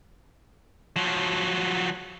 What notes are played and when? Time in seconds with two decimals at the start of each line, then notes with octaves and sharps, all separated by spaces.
0.96 F3 F#3